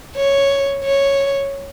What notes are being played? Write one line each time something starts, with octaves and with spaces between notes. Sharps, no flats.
C#5
C#5